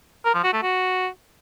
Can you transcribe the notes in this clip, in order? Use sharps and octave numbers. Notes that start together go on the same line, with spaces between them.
A#4
F3
F#4
A3
F#4